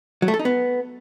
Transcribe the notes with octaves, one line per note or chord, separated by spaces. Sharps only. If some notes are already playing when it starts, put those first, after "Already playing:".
F#3
A3
A4
D#4
B3